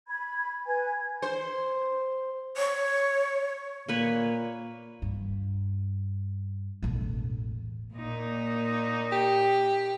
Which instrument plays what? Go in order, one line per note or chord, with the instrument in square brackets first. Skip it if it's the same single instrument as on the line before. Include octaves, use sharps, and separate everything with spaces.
[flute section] B5 G#6
B4 G#5 G#6
[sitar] C5
[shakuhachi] C#5
[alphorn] A#2 [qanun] A#3 B4 C#5
[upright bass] G2
E1 A1
[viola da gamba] A#2 A#3 D#4
[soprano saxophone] G4